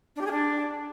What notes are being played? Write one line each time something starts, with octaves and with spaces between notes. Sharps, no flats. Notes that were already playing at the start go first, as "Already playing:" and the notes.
D4
G4
G#4
D4